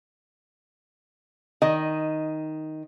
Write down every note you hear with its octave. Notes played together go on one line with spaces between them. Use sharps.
D#3 D#5